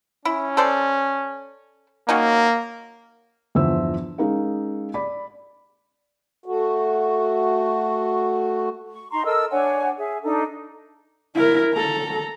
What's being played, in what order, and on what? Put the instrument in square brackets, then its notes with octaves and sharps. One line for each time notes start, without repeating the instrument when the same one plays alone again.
[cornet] C#4 [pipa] E4
[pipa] A4 C5 D5
[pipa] F#3 C#4 D#4 [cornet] A#3
[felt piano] G1 E2 F3 C5 E5 E6
G#3 C#4 D#4 A#4 F5
D5 B5
[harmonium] A3 F#4
[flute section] C#6
D#4 A#5 C6 C#6
A4 A#4 D#5 E6
D4 C#5 F#5 G#5
G#4 E5
D4 D#4 A4
[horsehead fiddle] E4 A#4
A4 A#5